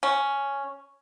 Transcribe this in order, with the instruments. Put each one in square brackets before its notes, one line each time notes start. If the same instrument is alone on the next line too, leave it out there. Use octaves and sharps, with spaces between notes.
[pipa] C#4